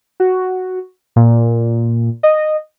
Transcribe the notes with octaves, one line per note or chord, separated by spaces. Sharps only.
F#4
A#2
D#5